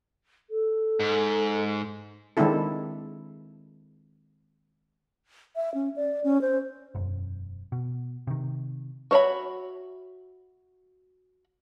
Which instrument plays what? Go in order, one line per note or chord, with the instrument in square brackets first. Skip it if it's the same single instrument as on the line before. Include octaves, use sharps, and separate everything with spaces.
[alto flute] A4
[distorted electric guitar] G#2
[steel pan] D#3 G#3 C4 D4 E4 A4
[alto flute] E5
C#4
D5
C#4
C5
[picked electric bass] E1 F#2
B2
C3 D#3
[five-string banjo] F#4 C5 C#5 E5 B5